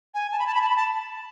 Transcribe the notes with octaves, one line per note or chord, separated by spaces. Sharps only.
G#5
A5
B5
A5
B5
A5
B5
A5